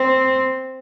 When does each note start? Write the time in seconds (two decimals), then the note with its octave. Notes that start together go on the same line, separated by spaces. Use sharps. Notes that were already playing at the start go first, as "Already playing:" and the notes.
Already playing: C4